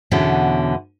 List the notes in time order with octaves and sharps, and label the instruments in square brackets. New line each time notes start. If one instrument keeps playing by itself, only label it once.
[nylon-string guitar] E2 B2 D3 B3 C#4